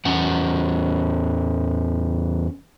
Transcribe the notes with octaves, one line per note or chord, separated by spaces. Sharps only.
E2 C#4 F#5